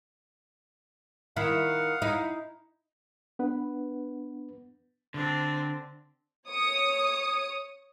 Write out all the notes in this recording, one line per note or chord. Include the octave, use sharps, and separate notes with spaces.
D#3 E4 F5 F#5
D#4 E4
B3 D4 B4 F#5
D3 C4 D4
C#5 D#6 C#7